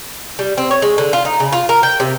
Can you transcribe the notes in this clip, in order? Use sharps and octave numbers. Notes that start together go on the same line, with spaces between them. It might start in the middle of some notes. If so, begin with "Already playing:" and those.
G3
C4
C#5
G#3
D3
F4
D#4
C#3
F4
A#4
G5
C3